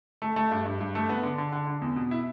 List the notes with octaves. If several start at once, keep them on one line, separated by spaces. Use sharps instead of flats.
A3
A3
G2
G2
G2
A3
B3
D3
D3
D3
D3
E2
B2
E4